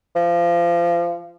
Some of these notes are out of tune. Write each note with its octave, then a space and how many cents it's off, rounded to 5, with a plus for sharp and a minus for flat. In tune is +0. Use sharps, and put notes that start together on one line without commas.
F3 -25